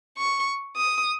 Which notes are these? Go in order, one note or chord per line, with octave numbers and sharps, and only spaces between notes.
C#6
D#6